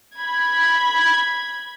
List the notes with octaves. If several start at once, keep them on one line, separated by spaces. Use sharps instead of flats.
B5 G#6